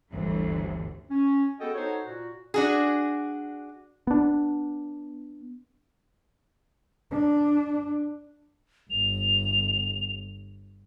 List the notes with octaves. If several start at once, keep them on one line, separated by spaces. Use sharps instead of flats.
G1 D2 E3
C#4
B3 F#4 G#4 A4 D#5 G5
D#4 F#4 A4 C5 C#5
A#2 F#4
D4 F#4 G#4
B3 D4
D4
G1 F7